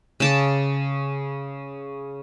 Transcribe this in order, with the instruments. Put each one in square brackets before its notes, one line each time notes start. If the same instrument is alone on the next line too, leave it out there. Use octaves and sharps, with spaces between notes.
[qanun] C#3 A5 D6